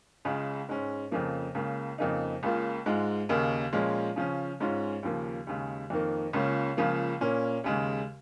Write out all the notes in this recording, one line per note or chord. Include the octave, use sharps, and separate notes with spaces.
C#2 C#3 G#3
G#2 G#3 C#4
F2 C#3 F3 A#3
C#2 C#3 A#3
F2 C#3 A#3 D#4
C#2 C#3 A#3 F4
G#2 G#3 F4
D#2 C#3 A#3 D#4
A#2 F3 G#3 C#4 F4
C#3 F3 C#4
G#2 G#3 C#4 F4
D#2 C#3 F3 A#3
D#2 C#3 G#3
F2 D#3 A#3
C#2 C#3 A#3 C#4 F4
C#2 C#3 F3 A#3
A#2 A#3 C#4
D#2 C#3 G#3